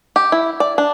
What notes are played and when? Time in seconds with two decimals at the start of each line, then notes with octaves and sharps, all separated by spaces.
0.16 G4
0.32 E4
0.60 D5
0.78 D4